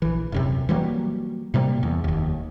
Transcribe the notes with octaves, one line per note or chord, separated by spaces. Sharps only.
A#1 E3
D#1 F#2 C3
E3 F#3 G3 A#3
A2 C3 G3 A#3
E2
F1 D#2